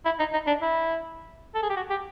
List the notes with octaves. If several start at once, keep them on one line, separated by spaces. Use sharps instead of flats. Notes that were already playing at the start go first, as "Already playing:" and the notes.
E4
D#4
D#4
D4
E4
A4
G#4
G4
F#4
G4